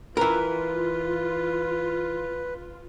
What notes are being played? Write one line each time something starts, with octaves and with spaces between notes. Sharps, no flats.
E3 F4 A#4 B4